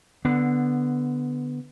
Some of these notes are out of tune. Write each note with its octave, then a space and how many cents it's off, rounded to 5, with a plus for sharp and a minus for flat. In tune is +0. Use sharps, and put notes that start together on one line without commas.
D3 +0 B3 +0